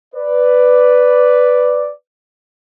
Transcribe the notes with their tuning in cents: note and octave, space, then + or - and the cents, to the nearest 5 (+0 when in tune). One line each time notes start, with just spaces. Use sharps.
B4 +5 D5 +0